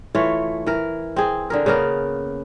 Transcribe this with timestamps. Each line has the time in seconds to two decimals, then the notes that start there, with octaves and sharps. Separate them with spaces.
0.15 E3 A3 F4 C#5
0.66 E3 A#4
1.16 C4 G#4
1.50 D3 G#4 A#4
1.66 C#3 A#3 B3 A#4